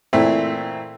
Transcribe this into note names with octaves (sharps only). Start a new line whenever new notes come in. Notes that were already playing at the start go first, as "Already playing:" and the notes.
A#2 E3 A3 C4